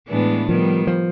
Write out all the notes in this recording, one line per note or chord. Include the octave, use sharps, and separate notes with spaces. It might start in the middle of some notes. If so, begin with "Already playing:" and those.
A2 E3 G#3 B3 D4
D#3 F3 G3 B3
F3